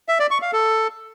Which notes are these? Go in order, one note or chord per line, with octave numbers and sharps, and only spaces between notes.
E5
D5
C#6
F5
A4